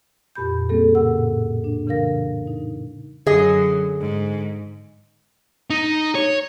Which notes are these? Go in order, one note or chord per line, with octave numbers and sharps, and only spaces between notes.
F2 A#2 G4 B5 G6
G3 A#3 C4 C#4 G#4 A4
A2 C#3 A#4 F#5 E6
D4
C#3 E3 A#4 F5 A#6
D#4
F#2 D3 F#3 G#4 D#5
G#2
D#4
C#5